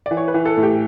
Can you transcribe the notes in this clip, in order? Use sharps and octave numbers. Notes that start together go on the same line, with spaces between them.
E3 D5
C#5
B4
E3
A4
A2
G4